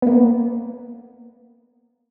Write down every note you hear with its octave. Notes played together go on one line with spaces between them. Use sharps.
A#3 B3